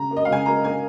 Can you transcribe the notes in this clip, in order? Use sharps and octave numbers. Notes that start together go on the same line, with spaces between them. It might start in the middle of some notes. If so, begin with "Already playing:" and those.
Already playing: C#3 A#5
A#3
D#5
F5
C#3 G#5
A#3 A#5
A#3 G#5